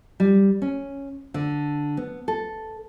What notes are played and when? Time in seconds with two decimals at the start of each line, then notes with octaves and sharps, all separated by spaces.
0.20 G3
0.62 C#4
1.34 D3
1.97 B3
2.28 A4